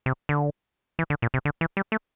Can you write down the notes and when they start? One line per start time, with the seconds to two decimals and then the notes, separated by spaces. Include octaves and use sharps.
0.06 C3
0.29 D3
0.99 E3
1.10 D3
1.22 A#2
1.34 C3
1.45 D3
1.61 E3
1.77 G3
1.92 A3